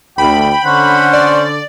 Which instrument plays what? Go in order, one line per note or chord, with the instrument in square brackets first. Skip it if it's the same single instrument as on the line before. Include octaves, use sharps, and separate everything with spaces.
[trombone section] D2 [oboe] G5 [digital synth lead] B5
[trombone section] D3 [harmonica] C#4 C5 [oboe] F#5
[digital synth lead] D5